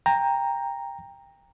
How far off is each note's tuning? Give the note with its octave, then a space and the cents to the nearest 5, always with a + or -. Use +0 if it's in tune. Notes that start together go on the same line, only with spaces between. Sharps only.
G5 +20 A#5 +0